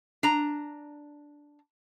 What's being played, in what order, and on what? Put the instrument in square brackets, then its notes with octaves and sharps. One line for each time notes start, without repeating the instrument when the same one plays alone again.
[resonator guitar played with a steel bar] D4 A#5